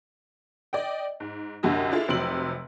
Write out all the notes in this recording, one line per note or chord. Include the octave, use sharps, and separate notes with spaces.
D5 D#5 G5
G#2
C2 F#2 D3 F#4 G4 D#5
D4 E4 F4 G#4 A4
F1 C3 F#3 C6 D7 F#7